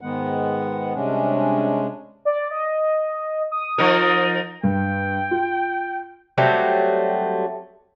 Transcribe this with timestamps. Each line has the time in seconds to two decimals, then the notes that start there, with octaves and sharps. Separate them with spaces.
0.01 G#2 D#3 G#3 B3 F#5
0.95 C3 G3 G#3 C#4 D4
2.25 D5
2.51 D#5
3.51 D#6
3.78 F3 D#4 A#4
4.64 G2 G5
5.31 F4
6.38 F#3 G3 A3 C4